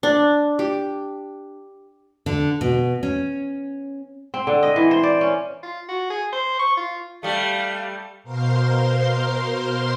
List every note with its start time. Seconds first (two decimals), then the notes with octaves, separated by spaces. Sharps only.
0.03 D4
0.59 G4
2.26 D3
2.61 B2
3.03 C#4
4.34 C4
4.47 D3
4.63 D#5
4.76 E3
4.91 C5
5.03 D5
5.21 C#4
5.63 F4
5.89 F#4
6.10 G#4
6.33 C5
6.59 C#6
6.77 F4
7.23 G3 A3 F5
8.23 B2 A#4 C5 F5 C6